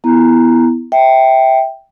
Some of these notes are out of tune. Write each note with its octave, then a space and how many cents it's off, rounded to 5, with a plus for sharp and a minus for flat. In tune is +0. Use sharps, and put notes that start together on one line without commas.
B3 +5 E4 +0 A#5 +0
E5 -15 G5 +0